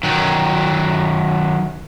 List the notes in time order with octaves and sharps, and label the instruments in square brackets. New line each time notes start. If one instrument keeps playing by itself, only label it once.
[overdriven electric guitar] D#3 F#3